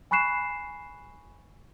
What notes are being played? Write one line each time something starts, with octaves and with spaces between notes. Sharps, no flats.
G#5 B5 C#6 F#6 C7 E7